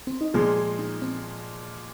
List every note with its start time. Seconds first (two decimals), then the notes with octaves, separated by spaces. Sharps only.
0.07 C4
0.21 D#4
0.34 A#2 F3 G#3 F4
0.57 G#4
0.79 D#4
1.02 C4